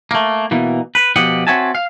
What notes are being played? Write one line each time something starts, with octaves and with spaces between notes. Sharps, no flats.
A3 A#3
B2 E3 A#3
B4
B2 F3 G4 D#5 F#5
C4 F#4 C#5 E5 G#5 A5
F5